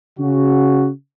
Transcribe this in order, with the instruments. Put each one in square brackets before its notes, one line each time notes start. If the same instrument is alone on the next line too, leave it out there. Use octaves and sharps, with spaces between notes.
[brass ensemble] C#3 F#4